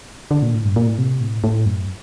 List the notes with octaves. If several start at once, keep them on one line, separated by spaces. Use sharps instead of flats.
D3
A#2
A2
G2
A#2
A2
C3
A2
A2
F#2